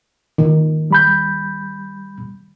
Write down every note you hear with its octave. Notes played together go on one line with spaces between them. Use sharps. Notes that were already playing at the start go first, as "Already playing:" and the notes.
D#3
G3 B5 G6